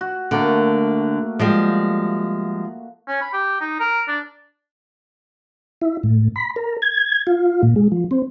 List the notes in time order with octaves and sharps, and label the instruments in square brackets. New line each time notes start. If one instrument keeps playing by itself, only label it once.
[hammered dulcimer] F#4
[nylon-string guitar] D3 [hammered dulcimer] A3 A#3 F#4
[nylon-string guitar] F3 G3 G#3
[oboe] C#4
B5
G4
D#4
A#4
D4
[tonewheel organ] E4
A2
B5
A#4
G#6
F4
A#2
G#3
F3
C4